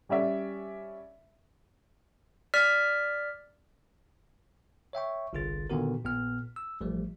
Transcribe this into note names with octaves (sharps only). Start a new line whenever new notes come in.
G3 C#4 D5 E5
D5 F6 B6
C#5 E5 G5 C#6
G1 C2 D3 F4 G#4 A6
A#2 D3 D#3 B3 F#4 A#4
A#1 A#2 B3 F6
E6
A1 F3 G3 A3